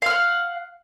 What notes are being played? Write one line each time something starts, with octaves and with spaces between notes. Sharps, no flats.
F5 F#5 F6